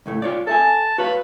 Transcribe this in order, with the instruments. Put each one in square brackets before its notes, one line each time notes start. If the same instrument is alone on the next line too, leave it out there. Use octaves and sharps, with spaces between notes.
[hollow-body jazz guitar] C#2 A2 A3
F4 C#5 D5
[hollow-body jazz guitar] A4 E5 G#5 [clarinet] A5
[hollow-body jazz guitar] F#4 C#5 F5 [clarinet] B4